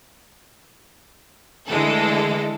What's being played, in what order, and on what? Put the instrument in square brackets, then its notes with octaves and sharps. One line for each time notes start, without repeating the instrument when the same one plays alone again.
[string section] D3 E3 G#3 A3 A4